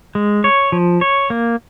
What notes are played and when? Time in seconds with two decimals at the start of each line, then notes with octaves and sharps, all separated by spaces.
0.15 G#3
0.44 C#5
0.72 F3
1.01 C#5
1.30 A#3